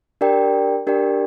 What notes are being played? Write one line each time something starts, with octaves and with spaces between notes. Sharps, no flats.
D4 G4 A#4 D5 G5
D4 G4 A#4 D5 G5